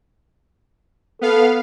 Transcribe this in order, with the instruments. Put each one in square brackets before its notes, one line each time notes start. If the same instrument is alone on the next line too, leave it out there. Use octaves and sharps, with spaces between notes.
[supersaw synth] B3 F5 [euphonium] A4